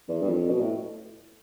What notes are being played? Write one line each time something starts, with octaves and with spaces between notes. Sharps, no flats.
E2
G2
F2
B2
A2